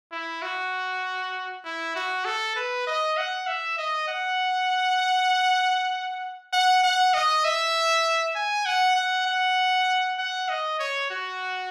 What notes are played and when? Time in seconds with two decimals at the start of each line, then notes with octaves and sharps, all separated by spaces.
0.12 E4
0.42 F#4
1.65 E4
1.96 F#4
2.25 A4
2.56 B4
2.87 D#5
3.18 F#5
3.47 E5
3.78 D#5
4.08 F#5
6.53 F#5
6.84 F#5
7.14 D#5
7.45 E5
8.36 G#5
8.66 F#5
8.96 F#5
9.27 F#5
10.19 F#5
10.49 D#5
10.79 C#5
11.11 F#4